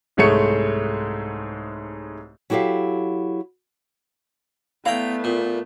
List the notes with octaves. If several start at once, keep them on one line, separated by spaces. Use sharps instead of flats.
C2 G#2 G#3 A3 C#5 C#7
F#3 E4 G4 A4 F5
A3 B3 E4 D5 F5 G5 A#5
A#2